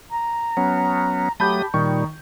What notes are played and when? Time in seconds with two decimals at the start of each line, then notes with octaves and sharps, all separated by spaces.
0.10 A#5
0.57 F#3 B3 C#4
1.40 F#3 A3 G4 A5 B5 D#6 G6
1.74 A#2 D#3 G3 D#4 C#6